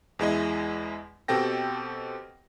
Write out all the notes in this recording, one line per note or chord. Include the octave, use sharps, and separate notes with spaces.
E2 G#3 E4 D#5
B2 C4 G4 A4 G5 A#6